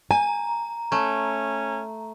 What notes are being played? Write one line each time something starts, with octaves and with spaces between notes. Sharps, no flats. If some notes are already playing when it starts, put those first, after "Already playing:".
G#5 A#5
A3 C#4